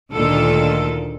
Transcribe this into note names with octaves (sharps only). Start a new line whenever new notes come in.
D2 A#2 D#3 F4 A4